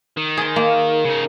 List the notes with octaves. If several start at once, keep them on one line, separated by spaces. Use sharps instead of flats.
D#3
G#4 C6
A#3
C#3 D#4